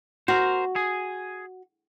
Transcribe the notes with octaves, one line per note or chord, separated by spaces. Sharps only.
F#4 A#4 C5
G#4